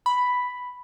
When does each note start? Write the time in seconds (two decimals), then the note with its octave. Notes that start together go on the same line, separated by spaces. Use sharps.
0.06 B5